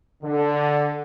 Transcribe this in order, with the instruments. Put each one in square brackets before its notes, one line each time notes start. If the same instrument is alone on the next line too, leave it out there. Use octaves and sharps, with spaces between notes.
[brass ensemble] D3